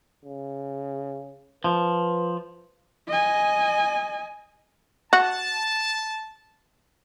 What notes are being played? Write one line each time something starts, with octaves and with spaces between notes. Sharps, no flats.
C#3
F3 B4
D#5 G#5
F#4 A5